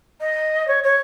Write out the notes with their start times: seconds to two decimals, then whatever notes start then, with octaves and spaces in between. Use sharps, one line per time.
0.20 D#5
0.67 C#5
0.83 C#5